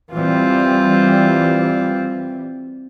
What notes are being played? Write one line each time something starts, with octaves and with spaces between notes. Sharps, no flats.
E3 G3 C4 F4